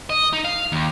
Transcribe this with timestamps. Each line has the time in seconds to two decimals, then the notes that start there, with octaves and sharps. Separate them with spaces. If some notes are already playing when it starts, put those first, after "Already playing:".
0.10 D#5
0.33 D#4
0.45 F5
0.72 D#2